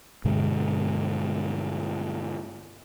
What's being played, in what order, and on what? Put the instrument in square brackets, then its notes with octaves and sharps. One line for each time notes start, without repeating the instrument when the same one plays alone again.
[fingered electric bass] G2 B2 D3 G#3